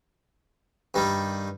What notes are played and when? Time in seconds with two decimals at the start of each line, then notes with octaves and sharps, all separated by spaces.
0.94 G2 D#3 G3